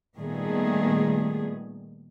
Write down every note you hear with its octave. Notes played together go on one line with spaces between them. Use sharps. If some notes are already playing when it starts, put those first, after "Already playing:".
A#2 D#3 G3 A3 B3 G#4